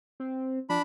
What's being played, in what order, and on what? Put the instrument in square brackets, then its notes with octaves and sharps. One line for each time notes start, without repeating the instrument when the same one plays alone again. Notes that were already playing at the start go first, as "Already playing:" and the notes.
[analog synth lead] C4
[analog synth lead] F3 [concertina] D4 B5